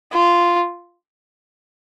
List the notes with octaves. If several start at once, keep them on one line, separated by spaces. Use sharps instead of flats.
F4